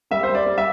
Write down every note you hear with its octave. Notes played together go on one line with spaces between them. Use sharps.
G3 E5
C5
G3
D5
G3
E5